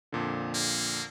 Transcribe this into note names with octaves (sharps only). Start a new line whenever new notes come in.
F2 A#2 D3
A#3